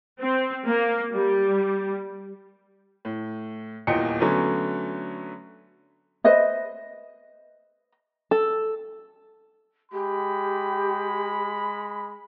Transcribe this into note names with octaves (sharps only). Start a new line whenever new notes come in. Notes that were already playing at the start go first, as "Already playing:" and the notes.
C4
A#3
G3
A2
D#1 E2 A#2 D#5 G5 C#7
D3 F#3 A3 B3 C#4
B4 C5 D#5 E5
A4
G#3 G4 B5